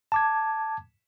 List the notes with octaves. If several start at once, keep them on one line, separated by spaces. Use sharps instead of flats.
A5 D6 G#6